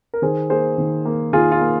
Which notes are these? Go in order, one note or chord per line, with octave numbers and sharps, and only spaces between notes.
A#4
D#3 G#4 C5
A#3 G#4 C5
D#3
A#3
D#3 F4 G#4
F4
A#3